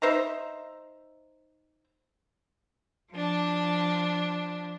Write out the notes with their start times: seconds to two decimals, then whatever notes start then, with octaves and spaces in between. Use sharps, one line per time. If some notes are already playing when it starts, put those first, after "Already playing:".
0.02 D#4 C5 E5 A#5
3.11 F3 D4